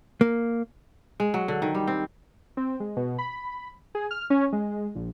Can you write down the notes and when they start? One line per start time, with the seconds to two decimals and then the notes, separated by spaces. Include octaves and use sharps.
0.21 A#3
1.20 G#3
1.34 F#3
1.48 D3
1.62 D#3
1.74 G3
1.87 C4
2.57 C4
2.80 G#3
2.97 B2
3.18 B5
3.95 G#4
4.11 F6
4.30 C#4
4.52 G#3
4.95 A#1